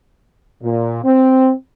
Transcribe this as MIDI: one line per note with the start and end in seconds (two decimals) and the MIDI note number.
0.63 1.02 46
1.04 1.52 60